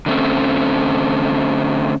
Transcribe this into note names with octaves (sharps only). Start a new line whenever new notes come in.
D3 A3 C4 C#4